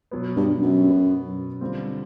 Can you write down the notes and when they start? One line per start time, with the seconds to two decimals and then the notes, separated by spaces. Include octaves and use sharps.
0.11 B2 F#3 B3
0.36 G2
0.61 F#2
0.86 B2 F#3 B3
1.61 D3 G3 C4 F4